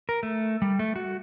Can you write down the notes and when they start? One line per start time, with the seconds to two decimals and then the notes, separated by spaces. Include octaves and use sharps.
0.09 A#4
0.23 A3
0.62 G3
0.79 A3
0.96 F#4